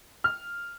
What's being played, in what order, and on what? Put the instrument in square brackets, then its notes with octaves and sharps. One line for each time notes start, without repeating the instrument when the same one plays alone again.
[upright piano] F6